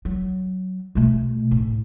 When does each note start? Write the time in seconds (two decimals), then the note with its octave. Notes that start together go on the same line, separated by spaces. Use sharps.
0.05 F#3
0.95 B2 A3
1.51 A2